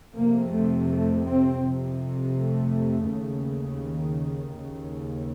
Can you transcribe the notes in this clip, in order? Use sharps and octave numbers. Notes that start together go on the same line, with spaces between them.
F2 C3 A#3
A3
A3
C4
F2 C3
A3
D#2 C#3
D#3
D#2 C#3